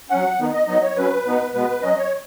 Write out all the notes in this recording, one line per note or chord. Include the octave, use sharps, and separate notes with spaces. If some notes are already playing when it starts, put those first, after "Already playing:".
F#3 C#4 F#5
D#3 B3 D#4
D#5
F#3 B3 D#4 D#5
C#5
F#3 C#4 B4
B2 B3 D#4
B2 G#3 B3 B4
F#3 C#4 D#5
C#5